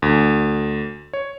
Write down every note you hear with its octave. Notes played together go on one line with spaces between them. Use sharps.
D2
C#5